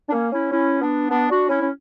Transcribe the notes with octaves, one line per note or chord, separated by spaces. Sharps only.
D4
A#3 C#4
C#4 E4
C#4 E4
B3 D4
B3 D4
D4 F#4
C#4 E4
C#4